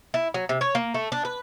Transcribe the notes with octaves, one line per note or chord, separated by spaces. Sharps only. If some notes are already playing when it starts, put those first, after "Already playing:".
E4
F#3
C3
C#5
A#3
A3
D4
B4